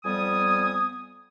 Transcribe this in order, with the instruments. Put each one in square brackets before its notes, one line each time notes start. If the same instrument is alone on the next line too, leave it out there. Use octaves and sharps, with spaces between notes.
[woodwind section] F2 G3 B3 G#5 D#6